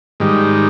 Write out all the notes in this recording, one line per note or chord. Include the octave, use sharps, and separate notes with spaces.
G#2 D#3 G3